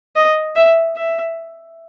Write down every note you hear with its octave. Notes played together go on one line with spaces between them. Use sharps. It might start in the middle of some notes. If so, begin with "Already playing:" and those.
D#5
E5
E5